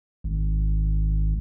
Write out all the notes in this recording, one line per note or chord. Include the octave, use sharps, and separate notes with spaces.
G#1